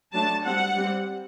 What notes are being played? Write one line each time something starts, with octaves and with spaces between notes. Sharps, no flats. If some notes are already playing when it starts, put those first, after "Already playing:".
F#3 A3 D4 A5
G3 C4 F#5
G3 C4